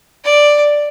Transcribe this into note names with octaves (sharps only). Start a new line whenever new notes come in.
D5